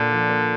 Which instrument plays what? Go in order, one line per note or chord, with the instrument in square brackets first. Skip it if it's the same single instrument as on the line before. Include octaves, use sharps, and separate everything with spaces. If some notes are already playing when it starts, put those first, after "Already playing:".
Already playing: [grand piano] A#2 [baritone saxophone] D3
[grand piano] F3
A#3